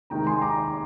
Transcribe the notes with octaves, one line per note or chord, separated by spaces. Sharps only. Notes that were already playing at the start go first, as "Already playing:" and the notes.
C3 D#3 G#3 D#4 G5 A#5
G#5 C6
A#5 D6